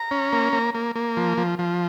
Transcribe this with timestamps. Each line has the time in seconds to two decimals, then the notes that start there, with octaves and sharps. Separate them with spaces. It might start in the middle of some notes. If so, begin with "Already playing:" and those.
Already playing: A#5
0.11 C#4
0.32 A#3
0.53 A#3
0.74 A#3
0.95 A#3
1.17 F3
1.38 F3
1.59 F3